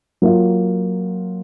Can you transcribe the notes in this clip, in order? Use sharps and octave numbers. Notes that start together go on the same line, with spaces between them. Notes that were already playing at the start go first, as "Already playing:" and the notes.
F#3 A#3 F4